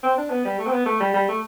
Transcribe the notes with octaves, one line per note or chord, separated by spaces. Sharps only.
C4
D4
B3
G3
A3
C4
B3
A3
G3
G3
A3